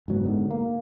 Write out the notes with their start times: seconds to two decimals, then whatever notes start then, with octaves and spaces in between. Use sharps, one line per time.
0.08 F#1 G#2 F#3 B3
0.24 G#2 D3 B3
0.51 A#3